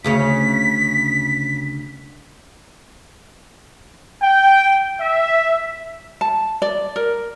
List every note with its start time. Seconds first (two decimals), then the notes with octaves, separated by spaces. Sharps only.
0.04 D2 C#3 C#4 B6
4.21 G5
5.00 E5
6.21 A5
6.62 D5
6.96 A#4